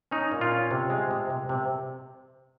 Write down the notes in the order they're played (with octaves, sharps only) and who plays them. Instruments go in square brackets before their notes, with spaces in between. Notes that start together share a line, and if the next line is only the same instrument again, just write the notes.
[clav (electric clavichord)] C#4 D#4
A#2
F4
C#4
C3
G#3
C3
C3
C3